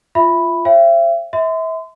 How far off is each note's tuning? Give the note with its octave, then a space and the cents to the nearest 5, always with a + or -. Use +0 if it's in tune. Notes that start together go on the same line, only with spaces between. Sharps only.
F4 -15 E5 +0 B5 +0
C#5 -40 E5 +40 G5 +0
E5 -30 C6 -35